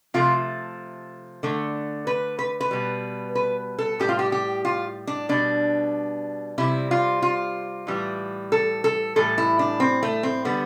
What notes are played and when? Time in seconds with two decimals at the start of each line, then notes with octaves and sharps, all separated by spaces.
0.14 C3 F3 A3 F4
1.43 D3 A3
2.07 B4
2.39 B4
2.61 B4
2.71 B2 G3
3.35 B4
3.79 A4
3.99 A2 G3 G4
4.09 F4
4.19 G4
4.32 G4
4.65 F4
5.07 D4
5.29 B2 G3 D4
6.58 C3 G3 E4
6.91 F4
7.22 F4
7.87 A2 E3 G3
8.52 A4
8.84 A4
9.16 A2 E3 G3 A4
9.38 E4
9.59 D4
9.80 C4
10.03 A3
10.23 C4
10.45 D3 G3 B3